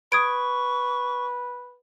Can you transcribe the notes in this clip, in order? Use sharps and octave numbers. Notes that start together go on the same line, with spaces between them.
B4 C#6 D#6 G#6 D7